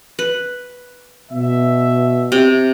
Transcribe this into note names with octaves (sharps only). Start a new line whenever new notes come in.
B4
B2 E5
C3 G5